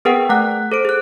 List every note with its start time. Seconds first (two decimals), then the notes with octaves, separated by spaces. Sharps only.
0.05 B3 G#4 A#4 B4 F#5 G5
0.29 A3 F#5 F#6
0.72 A4 C5 D7
0.85 G#4 F#6